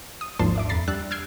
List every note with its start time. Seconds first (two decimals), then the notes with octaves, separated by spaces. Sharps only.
0.21 D#6
0.39 G#1 D#2 F3 D4 A5 C6
0.56 D5 E5 D6
0.69 F2 A#5 B5 A6 C7
0.88 G3 D4 D5 E6 F#6 A6
1.11 E6 F6 G6 G#6 C7 D7